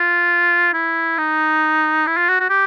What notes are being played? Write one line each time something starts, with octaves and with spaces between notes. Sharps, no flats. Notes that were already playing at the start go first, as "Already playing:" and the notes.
Already playing: F4
E4
D#4
E4
F4
F#4
F#4
G4